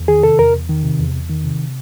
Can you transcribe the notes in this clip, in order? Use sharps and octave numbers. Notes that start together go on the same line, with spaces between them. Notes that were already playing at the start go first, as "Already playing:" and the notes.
Already playing: E2
D#3 G#4
C3 A4
E2 A#4
E2
D#3
C3
E2
E2
D#3
C3